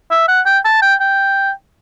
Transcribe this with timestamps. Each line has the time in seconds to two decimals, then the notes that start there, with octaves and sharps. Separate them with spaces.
0.11 E5
0.28 F#5
0.46 G5
0.65 A5
0.82 G5
1.00 G5